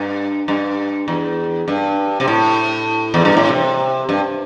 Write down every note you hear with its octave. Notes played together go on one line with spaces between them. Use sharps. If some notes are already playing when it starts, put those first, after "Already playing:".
Already playing: G2
G2
E2
G2
C3
A2
E2
G2
A2
C3
G2